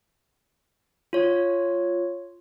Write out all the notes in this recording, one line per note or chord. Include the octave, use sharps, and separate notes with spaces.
F4 C#5